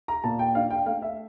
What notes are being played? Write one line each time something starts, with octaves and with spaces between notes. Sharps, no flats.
A#5
A#2 A5
G5
D4 F5
G5
A3 F5
E5